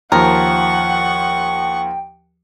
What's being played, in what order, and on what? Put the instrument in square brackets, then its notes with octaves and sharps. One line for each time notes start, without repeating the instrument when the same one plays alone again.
[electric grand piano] D#2 F3 [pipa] A#4 [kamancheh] F#5 C#6 [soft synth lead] G5